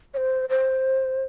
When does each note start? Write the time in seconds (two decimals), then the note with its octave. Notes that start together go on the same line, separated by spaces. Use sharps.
0.14 C#5
0.17 C5
0.49 C5